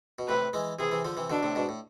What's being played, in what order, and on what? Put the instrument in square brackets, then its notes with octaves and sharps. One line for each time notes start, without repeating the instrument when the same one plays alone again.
[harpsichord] B2
[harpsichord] A2 C3 [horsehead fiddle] B4
[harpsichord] E3 G#3
[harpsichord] C3 E3 [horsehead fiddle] G#4
[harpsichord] C3 E3
D3 F3
C3 E3
[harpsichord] B2 D3 [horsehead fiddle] D4
[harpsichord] A2 C3
G#2 B2
A2